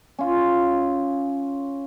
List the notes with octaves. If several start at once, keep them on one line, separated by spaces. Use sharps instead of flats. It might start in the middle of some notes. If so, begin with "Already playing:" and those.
C#4 F4